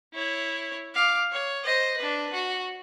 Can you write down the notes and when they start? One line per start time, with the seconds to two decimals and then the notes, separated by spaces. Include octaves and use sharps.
0.13 E4 C#5
0.94 F5 D6
1.32 C#5
1.64 C5 D#5
1.97 D4 B4
2.33 F#4